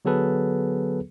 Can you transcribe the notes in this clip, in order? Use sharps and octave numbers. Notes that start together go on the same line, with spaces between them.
D3 F#3 B3 G#4 A4 B4